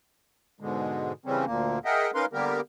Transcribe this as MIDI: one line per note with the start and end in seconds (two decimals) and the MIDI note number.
0.60 1.13 44
0.60 1.13 47
0.60 1.13 50
0.60 1.13 56
1.25 1.45 49
1.25 1.45 52
1.25 1.45 55
1.25 1.45 60
1.25 1.45 61
1.45 1.79 38
1.45 1.79 46
1.45 1.79 58
1.85 2.11 68
1.85 2.11 70
1.85 2.11 75
1.85 2.11 76
1.85 2.11 78
1.85 2.11 79
2.14 2.26 61
2.14 2.26 63
2.14 2.26 70
2.14 2.26 71
2.14 2.26 77
2.14 2.26 84
2.33 2.61 50
2.33 2.61 55
2.33 2.61 58
2.33 2.61 59
2.33 2.61 67
2.33 2.61 70